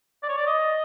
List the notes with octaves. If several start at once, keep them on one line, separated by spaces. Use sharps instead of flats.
D5
C#5
D5
D#5